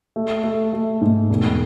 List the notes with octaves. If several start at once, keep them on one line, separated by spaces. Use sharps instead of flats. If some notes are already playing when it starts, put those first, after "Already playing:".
A3
A3
A3
G#2
E1